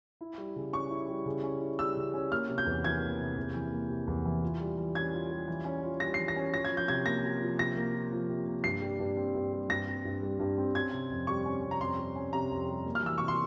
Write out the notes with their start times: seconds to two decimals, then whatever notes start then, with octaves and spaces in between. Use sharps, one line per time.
0.21 E4
0.38 G3
0.56 C#3
0.73 C#4 C#6
0.90 E4
1.08 G3
1.26 C#3
1.43 C#4
1.61 E4
1.79 G3 E6
1.97 C#3
2.14 C#4
2.32 A#3 F6
2.49 C3
2.58 G6
2.66 E2
2.84 E3 G#6
3.02 A#3
3.19 C3
3.37 E2
3.54 E3
3.72 A#3
3.89 C3
4.07 E2
4.25 E3
4.43 F4
4.60 G3
4.78 E3
4.95 C#4 G#6
5.12 F4
5.31 G3
5.48 E3
5.65 C#4
5.83 F4
6.00 G3 A#6
6.14 E3 C7
6.28 A#6
6.36 C#4
6.53 F4 A#6
6.65 G#6
6.72 F3
6.77 G6
6.88 C3 G#6
7.06 A#3 A#6
7.23 F4
7.41 F3
7.58 C3 A#6
7.76 A#3
7.94 F4
8.12 F3
8.29 C3
8.46 A#3
8.64 G2 C7
8.82 G3
8.99 G2
9.17 C4
9.35 G2
9.53 G3
9.69 G2 A#6
9.87 C4
10.05 G2
10.22 G3
10.39 G2
10.58 C4
10.75 C#4 G#6
10.92 C3
11.10 F2
11.27 G3 C#6
11.46 C#4
11.63 C3
11.71 A#5
11.81 F2 C6
11.98 G3
12.16 C#4
12.33 C3 A#5
12.50 F2
12.69 G3
12.85 A#3
12.95 F6
13.03 E3 E6
13.18 C3 C#6
13.28 C6